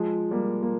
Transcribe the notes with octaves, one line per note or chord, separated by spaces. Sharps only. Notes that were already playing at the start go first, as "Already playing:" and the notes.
Already playing: F3 G#3
G3 A#3
A#3